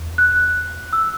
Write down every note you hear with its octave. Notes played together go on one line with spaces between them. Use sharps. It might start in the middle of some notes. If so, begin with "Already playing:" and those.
Already playing: E2
F#6
E6